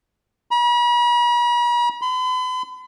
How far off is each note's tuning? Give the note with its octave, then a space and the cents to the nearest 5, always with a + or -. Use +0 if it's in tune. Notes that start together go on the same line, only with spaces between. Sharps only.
B5 -45
B5 +45